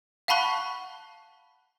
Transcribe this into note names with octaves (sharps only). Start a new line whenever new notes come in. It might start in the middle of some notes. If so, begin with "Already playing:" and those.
F5 F#5 A5 B5 C#6 F#6